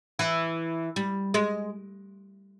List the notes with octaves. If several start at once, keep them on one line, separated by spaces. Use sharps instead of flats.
E3
G3
G#3